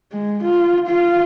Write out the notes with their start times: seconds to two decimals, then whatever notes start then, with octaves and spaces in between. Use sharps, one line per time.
0.12 G#3
0.44 F4
0.87 F4 F5